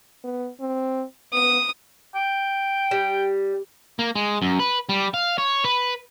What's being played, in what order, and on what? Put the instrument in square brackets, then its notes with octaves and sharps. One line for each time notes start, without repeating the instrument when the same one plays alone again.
[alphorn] B3
C4
[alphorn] B3 [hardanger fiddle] D#6
[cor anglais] G5
[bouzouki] G3
[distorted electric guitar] A#3
G#3
F#2
B4
G3
F5
C#5
B4